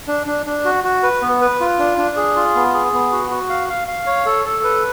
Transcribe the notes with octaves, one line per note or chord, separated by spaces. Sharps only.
D4
D4
D4
F#4
F#4
B4
B3
B4
F4
D4
D4
G#4
F4
B3
G#4
B3
F#4
F#4
F5
F5
F5
C#5
A4
A4
B4